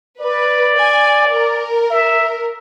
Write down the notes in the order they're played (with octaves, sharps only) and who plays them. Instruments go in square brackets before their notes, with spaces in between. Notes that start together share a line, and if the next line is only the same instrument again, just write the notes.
[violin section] B4 [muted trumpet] D5
[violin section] G#5
A#4
[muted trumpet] E5